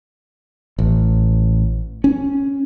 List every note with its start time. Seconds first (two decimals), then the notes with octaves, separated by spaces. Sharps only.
0.78 A1
2.04 C#4